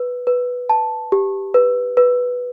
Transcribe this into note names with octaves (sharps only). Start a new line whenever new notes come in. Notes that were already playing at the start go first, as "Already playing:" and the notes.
Already playing: B4
B4
A5
G4
B4
B4